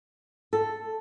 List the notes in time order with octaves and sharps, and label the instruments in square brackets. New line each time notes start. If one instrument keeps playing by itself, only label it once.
[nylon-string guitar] A4